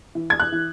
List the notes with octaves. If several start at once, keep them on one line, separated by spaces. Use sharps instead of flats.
E3
G#6
F#6
E3